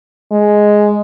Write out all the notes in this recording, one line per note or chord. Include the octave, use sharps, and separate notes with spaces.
G#3